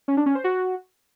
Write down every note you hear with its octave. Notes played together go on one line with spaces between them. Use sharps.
C#4
D4
C#4
C5
F#4